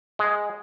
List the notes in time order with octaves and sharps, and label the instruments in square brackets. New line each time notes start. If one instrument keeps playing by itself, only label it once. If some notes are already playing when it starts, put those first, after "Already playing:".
[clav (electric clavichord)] G#3